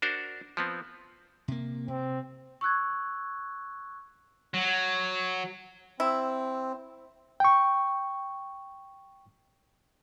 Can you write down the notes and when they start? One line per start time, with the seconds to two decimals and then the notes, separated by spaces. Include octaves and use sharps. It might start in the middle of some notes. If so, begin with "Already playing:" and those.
0.02 D4 F#4 A#4 C5
0.57 F3 B3 C4
1.48 C3 A#3
1.88 C3 C4
2.61 C#6 E6 F#6 G#6
4.54 F#3
6.00 C4 E4
7.40 G5 C#6